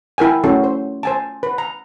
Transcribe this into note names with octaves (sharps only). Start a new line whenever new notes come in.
E4 A#4 G5 G#5
A3 C#4 E4 F#4 A4
C5
C5 G#5 A5
B4
A#5